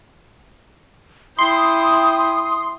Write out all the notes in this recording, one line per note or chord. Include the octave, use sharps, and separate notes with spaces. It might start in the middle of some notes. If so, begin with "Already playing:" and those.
E4 G5 C6 D#6